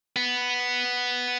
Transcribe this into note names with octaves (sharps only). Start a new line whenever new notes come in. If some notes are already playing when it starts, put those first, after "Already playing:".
B3